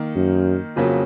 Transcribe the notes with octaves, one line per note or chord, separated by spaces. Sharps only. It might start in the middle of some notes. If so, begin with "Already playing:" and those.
Already playing: D#3 A#3 D#4
F#2
F2 C#3 F#3 A#3